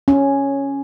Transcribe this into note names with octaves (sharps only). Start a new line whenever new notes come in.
C#4